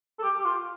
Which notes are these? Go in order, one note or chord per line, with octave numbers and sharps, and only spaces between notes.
A4
G4
G4
F4